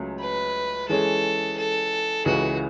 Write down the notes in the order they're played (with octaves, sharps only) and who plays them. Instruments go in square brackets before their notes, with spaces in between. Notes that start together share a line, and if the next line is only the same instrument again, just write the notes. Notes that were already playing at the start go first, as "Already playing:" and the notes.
Already playing: [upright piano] C#2 C#3 F#3 A3
[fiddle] B4
[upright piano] E3 G#3 C#4 G#4 [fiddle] A4
[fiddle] A4
[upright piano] C#2 C#3 E3 [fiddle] F#4